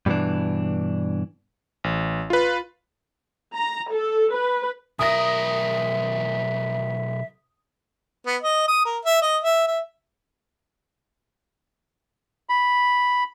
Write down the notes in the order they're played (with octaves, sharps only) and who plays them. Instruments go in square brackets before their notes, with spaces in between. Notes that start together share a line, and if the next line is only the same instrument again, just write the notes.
[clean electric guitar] G2 B2 D#3 E3 D4
[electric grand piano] A1
F4 B4
[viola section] A#5
A4
B4
[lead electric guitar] B1 A#4 [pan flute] E5 [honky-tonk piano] D#6 A#6
[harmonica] B3
D#5
D#6
A#4
E5
D#5
E5
E5
[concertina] B5